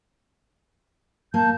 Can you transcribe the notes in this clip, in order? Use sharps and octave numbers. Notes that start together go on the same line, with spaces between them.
A#3 A5 G6